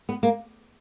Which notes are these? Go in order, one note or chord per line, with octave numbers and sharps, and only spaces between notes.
B3
A#3